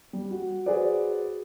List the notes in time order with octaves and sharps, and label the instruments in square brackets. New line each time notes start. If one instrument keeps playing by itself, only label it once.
[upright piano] G3
F#4
F#4 G#4 B4 C5 D5